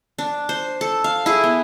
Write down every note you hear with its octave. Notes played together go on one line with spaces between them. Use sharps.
D4
C5
A4
F5
E4 G#4
B3